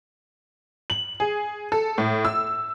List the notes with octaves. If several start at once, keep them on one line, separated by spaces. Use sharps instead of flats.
F#7
G#4
A4
A2
E6